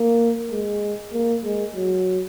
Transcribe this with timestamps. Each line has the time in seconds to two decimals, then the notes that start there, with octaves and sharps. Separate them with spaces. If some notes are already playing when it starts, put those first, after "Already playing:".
Already playing: A#3
0.51 G#3
1.12 A#3
1.44 G#3
1.75 F#3